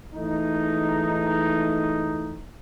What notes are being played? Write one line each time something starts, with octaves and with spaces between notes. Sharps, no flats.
E3 G#3 A3 D#4